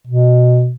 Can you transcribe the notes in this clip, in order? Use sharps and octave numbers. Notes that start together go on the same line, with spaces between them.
B2